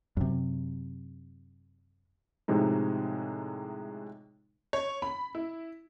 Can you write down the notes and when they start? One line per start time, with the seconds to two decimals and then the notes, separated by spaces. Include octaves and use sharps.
0.17 F#2 C3
2.48 A2 C3 F3 G#3 D#4
4.73 C#5
5.02 B5
5.35 E4